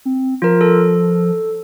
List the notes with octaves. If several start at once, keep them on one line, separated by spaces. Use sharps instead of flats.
C4
F3 F4 A#4
A4